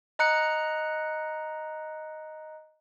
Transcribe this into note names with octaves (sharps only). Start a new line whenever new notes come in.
D#5 A#5 F#6 C#7